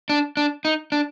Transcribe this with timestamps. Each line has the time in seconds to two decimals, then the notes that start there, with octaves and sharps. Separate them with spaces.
0.09 D4
0.37 D4
0.65 D#4
0.92 D4